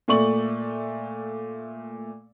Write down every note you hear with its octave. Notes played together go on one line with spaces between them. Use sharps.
A#2 A3 D5 C#6 F#7